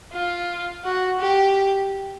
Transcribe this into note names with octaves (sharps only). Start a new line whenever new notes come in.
F4
F#4
G4